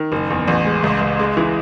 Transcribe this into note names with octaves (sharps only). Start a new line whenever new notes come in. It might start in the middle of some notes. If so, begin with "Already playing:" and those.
Already playing: D#3
F#1
E2
A1
G#3
C#2
C#2
G#3
E3